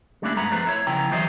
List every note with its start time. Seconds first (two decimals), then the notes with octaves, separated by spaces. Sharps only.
0.22 G3 A3 A#3 C#4 D4 E4
0.37 G2 G#3 B3 A#5 B5
0.51 F2 A3 B4 C5 A#5
0.67 E4 C#5
0.87 C#3 F3 B3 E4 G5 A#5
1.11 E3 F#3 G3 C5 D#5 E5